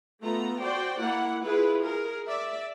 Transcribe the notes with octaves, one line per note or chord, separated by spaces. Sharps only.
A3 B3 F4 A#5
F#4 C5 D5 G5
A#3 E4 F#5
E4 F4 G#4 B4
G#4 A#4
D5 E5